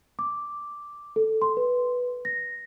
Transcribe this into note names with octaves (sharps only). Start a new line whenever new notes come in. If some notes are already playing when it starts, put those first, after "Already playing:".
D6
A4
C6
B4
A#6